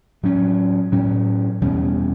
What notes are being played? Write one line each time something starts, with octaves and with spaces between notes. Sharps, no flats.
A2 F#3 C#4
A2 F#3 C#4
E2 B2 G3 C#4